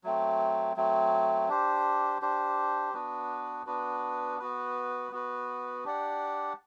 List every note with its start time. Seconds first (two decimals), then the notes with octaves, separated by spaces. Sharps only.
0.04 F#3 A3 C4
0.76 F#3 A3 C4
1.49 D4 G4 C5
2.21 D4 G4 C5
2.94 B3 D4 F#4 B4
3.66 B3 D4 F#4 B4
4.39 B3 F#4 B4
5.12 B3 F#4 B4
5.84 D4 G4 D5 F#5